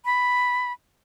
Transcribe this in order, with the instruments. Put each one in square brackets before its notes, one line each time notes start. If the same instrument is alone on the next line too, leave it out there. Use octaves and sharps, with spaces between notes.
[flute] B5